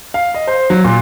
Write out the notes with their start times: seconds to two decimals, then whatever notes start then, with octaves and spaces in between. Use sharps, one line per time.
0.14 F5
0.34 D#5
0.47 C5
0.70 F#3
0.84 A#2